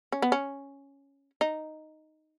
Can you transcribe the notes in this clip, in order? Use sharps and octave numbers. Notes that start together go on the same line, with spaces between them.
C#4
B3
C#4
D#4